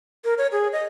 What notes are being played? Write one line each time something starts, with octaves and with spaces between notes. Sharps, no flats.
A#4
C#5
G#4
D#5